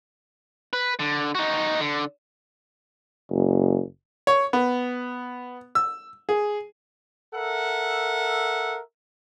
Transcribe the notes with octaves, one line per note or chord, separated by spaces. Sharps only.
B4
D3
D#4 F#4
D3
F#1
C#5
B3
E6
G#4
A4 A#4 E5 F#5